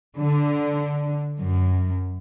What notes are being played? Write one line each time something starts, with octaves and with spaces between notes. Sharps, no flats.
D3
F#2